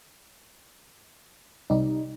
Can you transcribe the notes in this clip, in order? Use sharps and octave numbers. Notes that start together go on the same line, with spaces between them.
C2 C3 G3 D#4